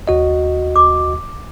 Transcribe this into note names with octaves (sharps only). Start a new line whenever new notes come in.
D#2 F#4 D#5
D6